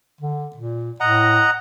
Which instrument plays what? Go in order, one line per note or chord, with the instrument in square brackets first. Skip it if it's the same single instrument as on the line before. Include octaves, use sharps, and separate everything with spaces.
[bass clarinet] D3
A#2
[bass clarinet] A2 [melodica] D#5 F#5 A#5